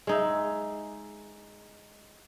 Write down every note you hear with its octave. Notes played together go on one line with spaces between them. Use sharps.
G#3 D#4 E5